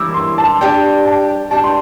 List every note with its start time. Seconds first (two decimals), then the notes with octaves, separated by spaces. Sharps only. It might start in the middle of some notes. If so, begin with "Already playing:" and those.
Already playing: E3 G3 A#3 E4 D6 E6
0.14 C6
0.38 A5
0.61 G3 D4 G4 G5
1.05 A5
1.51 G3 D4 G4 A5
1.64 C6